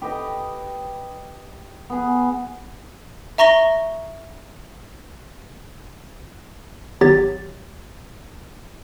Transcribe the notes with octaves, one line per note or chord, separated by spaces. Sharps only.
G4 B4 D#5
B3 G#4
E5 A#5 C#6 A#6 G7
G#1 F#3 B3 G4 C#5 A6